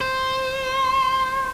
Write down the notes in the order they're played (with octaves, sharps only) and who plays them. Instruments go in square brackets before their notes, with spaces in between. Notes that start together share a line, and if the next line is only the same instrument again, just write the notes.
[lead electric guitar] C5